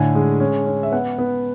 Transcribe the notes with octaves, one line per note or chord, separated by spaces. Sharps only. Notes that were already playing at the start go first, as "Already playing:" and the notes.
Already playing: A2 D3 G#5
G#3
C#4
C#4
E5
B3 F#5
B3